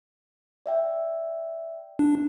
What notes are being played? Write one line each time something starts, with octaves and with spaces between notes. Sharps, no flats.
D5 E5 G5
D4